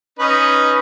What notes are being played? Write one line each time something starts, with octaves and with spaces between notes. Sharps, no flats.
C#4 D#4 B4